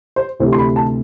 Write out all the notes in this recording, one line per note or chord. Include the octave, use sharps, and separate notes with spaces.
C5
D2 C3 E3 C5
C6
B5
A5